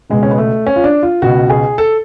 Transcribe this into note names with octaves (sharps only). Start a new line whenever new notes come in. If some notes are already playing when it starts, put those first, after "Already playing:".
C#2 B2 G#3
C#4
B3
A3
C#4
F4
D4
F4
C#2 B2 F#4
G#4
A4